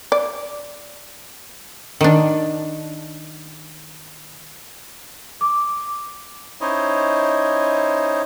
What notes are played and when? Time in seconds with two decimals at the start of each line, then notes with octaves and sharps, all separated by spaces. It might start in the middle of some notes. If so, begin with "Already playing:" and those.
0.12 D5
2.01 D#3 D4
5.41 D6
6.61 C#4 D#4 E4 C5 C#5 D#5